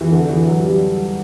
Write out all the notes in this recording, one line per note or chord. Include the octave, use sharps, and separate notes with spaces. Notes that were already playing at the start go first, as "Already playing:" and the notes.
E3
D3
E3
F#3
G3